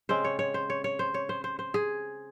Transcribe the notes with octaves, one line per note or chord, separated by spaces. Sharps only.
C#3 G#3 C4 C5
C#5
C#5
C5
C#5
C#5
C5
C#5
C5
C5
C5
G#4